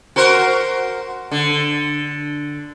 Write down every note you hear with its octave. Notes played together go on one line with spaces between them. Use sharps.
F#4 A#4 C5
D3